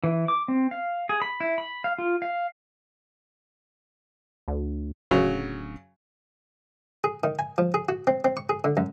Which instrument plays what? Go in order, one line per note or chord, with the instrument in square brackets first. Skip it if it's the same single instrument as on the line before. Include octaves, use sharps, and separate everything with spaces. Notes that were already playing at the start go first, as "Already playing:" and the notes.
[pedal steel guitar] E3
D6
C4
F5
G#4
B5
E4
B5
F5
F4
F5
[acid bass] D2
[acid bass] D1 [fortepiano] C#3 F#3
[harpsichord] G#4
D#3
G#5
F3
G#4
F#4
C4
C4
C#6
G#4
D3
F#2